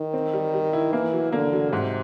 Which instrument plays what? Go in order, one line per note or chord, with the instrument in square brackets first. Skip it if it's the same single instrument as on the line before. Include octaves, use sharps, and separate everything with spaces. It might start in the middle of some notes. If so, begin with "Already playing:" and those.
Already playing: [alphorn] D#3
[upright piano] C4
G3
G3
E4
[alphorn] E3 [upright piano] A#3
[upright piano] F#3
[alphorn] D3 [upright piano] A#3
[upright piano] F#3
[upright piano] G#2 [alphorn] C3